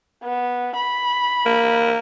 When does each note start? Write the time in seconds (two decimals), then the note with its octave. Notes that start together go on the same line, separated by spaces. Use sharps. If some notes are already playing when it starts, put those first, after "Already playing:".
0.23 B3
0.76 B5
1.46 A#3